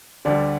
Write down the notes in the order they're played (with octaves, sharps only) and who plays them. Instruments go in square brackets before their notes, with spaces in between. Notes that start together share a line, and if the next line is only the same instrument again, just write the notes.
[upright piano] D2 D3 G3 [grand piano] D4 D5